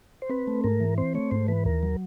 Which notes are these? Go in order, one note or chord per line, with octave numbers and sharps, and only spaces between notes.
C5
C4 B4
A3
G#2 A#4
E3
C4 C5
A3 C#5
G#2 C5
E3 B4
D#2 A#4
F#3